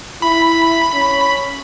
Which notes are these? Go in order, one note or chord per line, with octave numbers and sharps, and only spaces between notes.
E4 B5
C#4